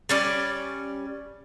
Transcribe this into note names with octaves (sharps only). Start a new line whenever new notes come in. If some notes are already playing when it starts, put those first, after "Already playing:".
G3 C#4 D5